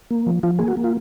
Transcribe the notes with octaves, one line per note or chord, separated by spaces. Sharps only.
A#3
F3
F3 F4
A#3 G#4
F#4
A#3
F4